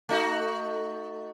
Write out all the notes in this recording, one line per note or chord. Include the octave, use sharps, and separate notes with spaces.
A3 D#4 F#4